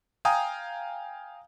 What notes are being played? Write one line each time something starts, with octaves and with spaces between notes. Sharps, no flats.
F5 G5 G#5 A#5 D#6